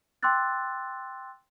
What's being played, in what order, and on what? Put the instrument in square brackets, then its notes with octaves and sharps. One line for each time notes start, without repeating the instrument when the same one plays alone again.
[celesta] G5 C6 D6 E6 F#6 A6